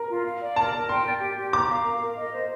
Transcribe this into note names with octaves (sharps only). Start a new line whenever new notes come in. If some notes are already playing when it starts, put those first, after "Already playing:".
Already playing: A#4
F4
F5
D5
A#4 A5
A#4
G5 C6
D5
G4
G4
A#5 D6
F5
A#4
A#4
D#5
C5